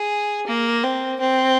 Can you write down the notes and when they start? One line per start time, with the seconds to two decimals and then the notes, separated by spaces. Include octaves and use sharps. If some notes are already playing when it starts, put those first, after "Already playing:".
Already playing: G#4
0.47 A#3
0.84 C4
1.20 C4